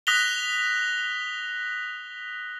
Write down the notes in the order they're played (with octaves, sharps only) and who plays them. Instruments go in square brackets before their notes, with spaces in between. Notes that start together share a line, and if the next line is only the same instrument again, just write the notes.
[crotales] D#6 F#6 A#6 B6 F7 G7